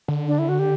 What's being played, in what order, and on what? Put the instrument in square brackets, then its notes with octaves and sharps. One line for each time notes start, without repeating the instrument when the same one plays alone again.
[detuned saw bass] D3
[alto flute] D4
E4
F#4
G4